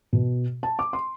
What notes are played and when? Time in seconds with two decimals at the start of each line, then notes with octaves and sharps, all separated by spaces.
0.13 B2
0.63 A5
0.79 D6
0.93 C6